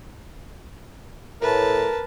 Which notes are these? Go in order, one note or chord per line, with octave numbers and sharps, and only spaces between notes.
A2 A#4 B4 A5